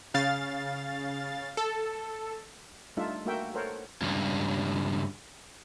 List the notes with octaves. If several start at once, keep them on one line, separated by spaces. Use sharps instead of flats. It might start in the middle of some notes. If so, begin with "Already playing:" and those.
C#3 F5 A6
A4
G3 A3 D4 D#4 F4 E5
A3 A#3 F#4 A#4 E5 G5
A4 A#4 C5 C#5 F#5
C#2 G2